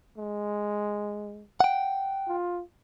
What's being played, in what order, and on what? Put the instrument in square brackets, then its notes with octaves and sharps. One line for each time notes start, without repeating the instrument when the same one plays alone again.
[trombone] G#3
[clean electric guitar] F#5 G5
[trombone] F4